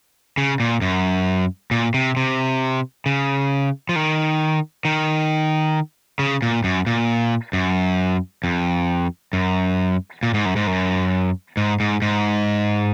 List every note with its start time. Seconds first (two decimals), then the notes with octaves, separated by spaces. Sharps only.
0.38 C#3
0.60 A#2
0.82 F#2
1.71 A#2
1.94 C3
2.17 C3
3.06 C#3
3.89 F3
3.96 D#3
4.85 D#3
6.19 C#3
6.42 A#2
6.64 F#2
6.87 A#2
7.53 F#2
8.44 F2
9.33 F#2
10.23 A#2
10.34 G#2
10.45 F#2
10.56 G#2
10.67 F#2
11.57 G#2
11.80 G#2
12.02 G#2